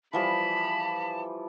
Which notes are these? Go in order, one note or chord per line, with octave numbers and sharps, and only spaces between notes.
E3 F3 G3 A5 B5